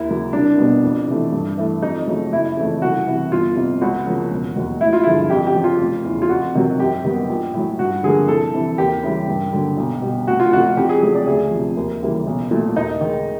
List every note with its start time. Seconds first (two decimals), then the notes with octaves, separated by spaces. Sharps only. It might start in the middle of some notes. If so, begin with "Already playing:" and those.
Already playing: D#2 E4
0.09 C#3 F#3 A#3
0.33 C2 D4
0.58 B2 G3 B3
0.84 F2
1.08 C3 E3 A3
1.32 G2
1.58 E3 A3
1.82 F2 D#4
2.07 C#3 F#3 A3
2.32 F#1 E4
2.57 F2 C#3 E3 A3
2.82 C2 F#4
3.07 C3 E3
3.32 G1 F4
3.56 F2 C3
3.81 C#2 F#4
4.06 C#3 F3 A#3
4.31 E1
4.56 D#2 D#3 F#3
4.81 A1 E4
4.93 F4
5.03 G2 D3 F3 G#3 E4
5.30 F2 G4
5.47 G4
5.55 C#3 F3
5.64 F4
5.80 F1
6.04 E2 C#3
6.22 F4
6.29 F2 F#4
6.55 C3 D#3 F#3
6.80 F#2 G4
7.05 D#3 G3 B3
7.30 A#1
7.54 A2 F#3
7.79 G2 F#4
8.03 D3 F3 A#3 G#4
8.28 C2 A4
8.54 C3 E3
8.78 D#2 G4
9.03 C#3 E3 G3
9.28 G2
9.53 D3 F#3 A#3
9.77 B1
10.02 B2 G3
10.27 F1 F#4
10.40 F4
10.52 F2 C3 F3 A3 F#4
10.77 F2 G4
10.89 G#4
11.02 C#3 F#3 A3 G#4
11.15 D5
11.27 D2 G#4
11.51 C3 F3
11.77 D#2
12.01 C#3 E3 G3 A#3
12.27 B1
12.51 A#2 F#3 A3
12.76 D#2 D#4
13.01 D#3 G#3